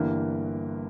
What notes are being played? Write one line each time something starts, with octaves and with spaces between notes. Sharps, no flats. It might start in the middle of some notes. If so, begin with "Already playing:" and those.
Already playing: G1 G2 E3 A#3